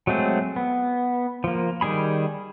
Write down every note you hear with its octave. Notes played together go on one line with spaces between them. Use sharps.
F#3 G#3 A3 C4 G#4
B3
F3 A#3
D#3 G3 G#4 B5